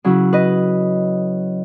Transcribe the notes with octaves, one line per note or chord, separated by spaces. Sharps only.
C#3 F#3 C#4 E4
B4 D#5